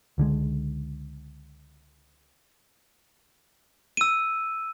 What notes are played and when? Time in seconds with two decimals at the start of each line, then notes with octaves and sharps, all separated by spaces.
0.18 C#2 D3 D#3 G#3
3.97 E6 D#7